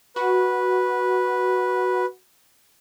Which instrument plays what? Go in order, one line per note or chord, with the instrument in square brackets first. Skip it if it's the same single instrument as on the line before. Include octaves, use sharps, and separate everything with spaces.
[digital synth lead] F#4 [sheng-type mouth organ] B4